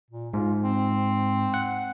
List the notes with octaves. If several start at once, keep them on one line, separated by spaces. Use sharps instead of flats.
A#2
G#2 F4
C4
F#5